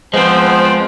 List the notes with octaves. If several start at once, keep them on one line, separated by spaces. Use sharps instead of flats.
F3 G#3 B3 C4 C5